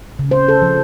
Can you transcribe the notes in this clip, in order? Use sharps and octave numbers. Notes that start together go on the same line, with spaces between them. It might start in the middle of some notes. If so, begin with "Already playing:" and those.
C#3
C5
A4
F3